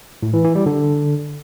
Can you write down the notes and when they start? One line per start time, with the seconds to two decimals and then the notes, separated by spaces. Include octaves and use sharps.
0.23 A2
0.33 E3
0.44 E3
0.55 G3
0.66 D3